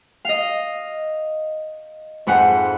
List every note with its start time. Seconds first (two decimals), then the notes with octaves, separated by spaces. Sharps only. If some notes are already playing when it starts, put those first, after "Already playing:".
0.25 D#5 F5
2.27 F2 G#2 B4 F#5